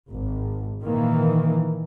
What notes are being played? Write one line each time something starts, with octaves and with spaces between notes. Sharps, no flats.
G#1
A#2 D#3 E3 A#3